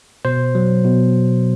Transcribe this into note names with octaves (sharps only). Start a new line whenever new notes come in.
B2 C5
F#3
B2